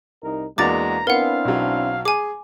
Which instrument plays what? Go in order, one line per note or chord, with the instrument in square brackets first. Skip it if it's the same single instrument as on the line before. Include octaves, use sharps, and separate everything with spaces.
[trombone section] C2 D#4 A#4
[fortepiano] E2 D4 F#4 [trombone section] G#3 A#3 [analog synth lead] A#5 [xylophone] D6 A6
[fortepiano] B3 [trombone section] C4 D4 E4 [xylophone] A#4 F#5 [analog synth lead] F5
[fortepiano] B1 F#3
[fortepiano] G#4 [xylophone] G#5 D6